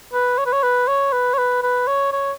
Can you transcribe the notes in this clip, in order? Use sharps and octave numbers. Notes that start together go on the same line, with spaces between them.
B4
C#5
B4
C#5
B4
C#5
B4
C#5
B4
B4
C#5
C#5